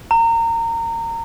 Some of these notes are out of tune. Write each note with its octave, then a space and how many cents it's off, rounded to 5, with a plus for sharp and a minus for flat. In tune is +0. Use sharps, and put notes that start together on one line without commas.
A#5 -25